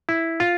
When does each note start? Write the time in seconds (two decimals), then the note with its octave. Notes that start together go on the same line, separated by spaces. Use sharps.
0.09 E4
0.40 F4